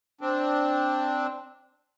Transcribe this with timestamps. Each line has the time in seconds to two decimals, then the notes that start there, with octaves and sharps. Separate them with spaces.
0.21 C4 D4